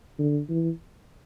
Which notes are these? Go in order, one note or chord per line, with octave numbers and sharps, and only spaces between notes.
D3
E3